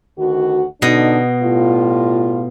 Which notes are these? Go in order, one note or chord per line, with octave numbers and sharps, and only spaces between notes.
D2 D#3 F#4
B2 D3 D4 D#4 D#5
A2 G3 F4